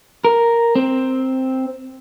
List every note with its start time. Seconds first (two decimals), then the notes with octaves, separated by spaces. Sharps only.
0.25 A#4
0.75 C4